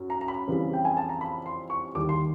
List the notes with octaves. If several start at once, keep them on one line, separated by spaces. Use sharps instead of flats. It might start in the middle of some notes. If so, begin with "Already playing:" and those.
Already playing: F#2
A#5
A#5
B5
F2 C#3 E3 G3
G5
G#5
A5
A#5
B5
C6
C#6
D#2 D#3 G3 D6
C6